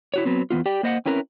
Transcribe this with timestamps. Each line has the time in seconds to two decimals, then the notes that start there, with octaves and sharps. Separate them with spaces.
0.14 E4 F#4 C#5
0.25 F#3 B3 C4
0.50 E2 D#3 B3 F4
0.66 G4 D5 G5
0.83 A#3 C5 D#5 F5 F#5
1.06 C4 C#4 E4 A#4 B4